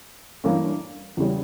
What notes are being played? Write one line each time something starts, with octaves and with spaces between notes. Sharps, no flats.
G2 E3 A#3 C#4
E2 C#3 G3 C#4